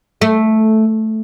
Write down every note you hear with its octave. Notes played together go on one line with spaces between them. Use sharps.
A3